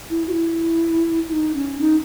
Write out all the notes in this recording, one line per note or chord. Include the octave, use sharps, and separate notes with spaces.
E4
F#4
E4
E4
D#4
C#4
D#4